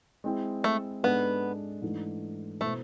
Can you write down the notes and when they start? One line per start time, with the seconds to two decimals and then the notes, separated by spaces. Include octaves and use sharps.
0.24 G#3 C4 E4
0.64 A3
1.03 G#2 G#3 B3 D4 A4
1.82 G#2 E3 A3 D4
2.61 B2 A3 B3 E4 A4 C5